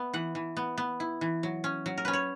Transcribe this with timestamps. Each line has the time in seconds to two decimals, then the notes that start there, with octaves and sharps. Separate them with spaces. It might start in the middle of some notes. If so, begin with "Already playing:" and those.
Already playing: B3 E5
0.13 E3 F#5
0.35 E3
0.57 B3
0.78 B3
1.00 E4
1.21 E3
1.43 F#3
1.64 C#4
1.86 F#3
1.98 A#4
2.05 C#4 B4
2.13 C#5